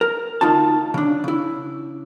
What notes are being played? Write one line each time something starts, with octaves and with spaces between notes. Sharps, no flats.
A#4
D2 D#4 F4 A5
C#3 D4
C#3 E4